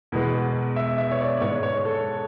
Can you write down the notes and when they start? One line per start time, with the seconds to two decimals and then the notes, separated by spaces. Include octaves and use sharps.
0.12 E2 B2 G#3 B4
0.76 E5
0.98 E5
1.12 C#5
1.21 D5
1.41 G#2 C#5
1.46 G#3
1.63 C#5
1.85 A4